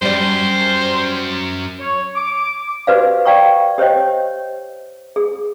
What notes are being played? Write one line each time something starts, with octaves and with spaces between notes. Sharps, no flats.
F#2 G3 C5 D5
C#5
D6
F#4 G4 B4 C5 D5 F5
D5 F5 G5 A#5 C#6
G4 C5 C#5 D#5 G5
G#4